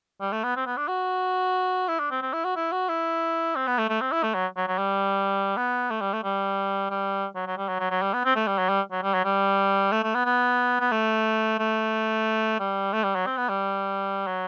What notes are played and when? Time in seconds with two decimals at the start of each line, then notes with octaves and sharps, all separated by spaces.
0.21 G3
0.32 A3
0.44 B3
0.57 C4
0.66 B3
0.77 D4
0.88 F#4
1.88 E4
2.00 D4
2.11 C4
2.22 C4
2.33 E4
2.44 F#4
2.56 E4
2.72 F#4
2.89 E4
3.56 C4
3.67 B3
3.78 A3
3.89 A3
4.01 C4
4.12 E4
4.23 A3
4.35 F#3
4.57 F#3
4.68 F#3
4.78 G3
5.57 B3
5.90 A3
6.01 G3
6.13 A3
6.24 G3
6.91 G3
7.35 F#3
7.47 F#3
7.58 G3
7.69 F#3
7.80 F#3
7.91 F#3
8.02 G3
8.14 B3
8.25 C4
8.36 A3
8.47 G3
8.58 F#3
8.69 G3
8.91 F#3
9.03 G3
9.14 F#3
9.25 G3
9.92 A3
10.03 A3
10.15 B3
10.25 B3
10.80 B3
10.92 A3
11.59 A3
12.60 G3
12.93 A3
13.04 G3
13.15 F#3
13.26 C4
13.38 B3
13.49 G3
14.27 F#3